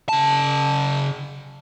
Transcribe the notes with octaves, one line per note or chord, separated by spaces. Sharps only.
C#3 A5